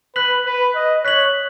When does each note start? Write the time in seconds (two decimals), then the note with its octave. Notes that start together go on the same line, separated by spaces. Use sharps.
0.16 B4 F#6 B6 F#7
0.46 B4
0.75 D#5
1.05 C#5 F#6 B6 F#7